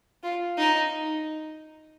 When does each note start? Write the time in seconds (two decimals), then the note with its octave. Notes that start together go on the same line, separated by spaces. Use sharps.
0.23 F4
0.58 D#4